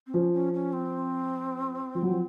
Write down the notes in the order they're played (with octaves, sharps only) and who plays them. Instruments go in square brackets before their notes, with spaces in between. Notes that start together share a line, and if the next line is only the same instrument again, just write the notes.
[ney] C4
[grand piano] F3 [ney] C#4
[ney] C#4
C#4
C4
[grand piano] F3
F#3
F3